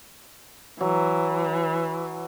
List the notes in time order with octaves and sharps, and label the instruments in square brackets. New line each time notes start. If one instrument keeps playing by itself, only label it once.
[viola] E3 [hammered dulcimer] F#3